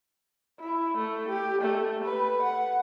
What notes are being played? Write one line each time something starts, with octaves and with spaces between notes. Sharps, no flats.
E4
A3
G4
A3
B4
F#5